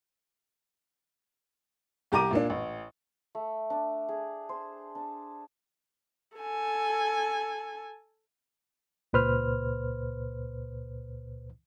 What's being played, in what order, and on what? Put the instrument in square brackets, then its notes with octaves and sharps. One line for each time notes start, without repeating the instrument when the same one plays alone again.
[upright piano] C2 G4 A#5 D6 D#7
A#2 A#3 D4
A1
[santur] A3
D4
G#4
C5
D4
[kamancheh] A4 G#5
[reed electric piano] C#2 A#2 B4 C5 F6